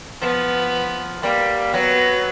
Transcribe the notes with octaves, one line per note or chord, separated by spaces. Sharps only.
F3 B3
G3 A#3
F#3 B3